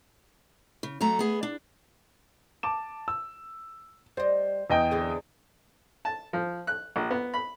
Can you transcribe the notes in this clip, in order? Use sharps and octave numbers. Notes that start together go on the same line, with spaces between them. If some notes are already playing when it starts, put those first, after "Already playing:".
C#3
F#2 F#3 A3 A#5
B3 G#4
D4
A5 D6 E7
E6
G3 C5 D#5
E2 D#5 G5
D3 C4 G#4
A5
F3
F#6
A#1
B3
B5